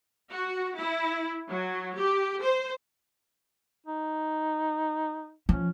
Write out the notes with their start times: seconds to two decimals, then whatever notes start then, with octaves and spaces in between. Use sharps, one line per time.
0.31 F#4
0.78 E4
1.49 F#3
1.96 G4
2.42 C5
3.87 D#4
5.49 F3 C#4